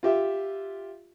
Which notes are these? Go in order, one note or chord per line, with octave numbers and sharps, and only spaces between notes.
F4 G4 E5